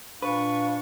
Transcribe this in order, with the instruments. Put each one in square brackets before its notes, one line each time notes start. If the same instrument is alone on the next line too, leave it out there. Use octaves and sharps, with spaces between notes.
[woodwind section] A#2 D4 [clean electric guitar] B4 [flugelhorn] F5 [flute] C#6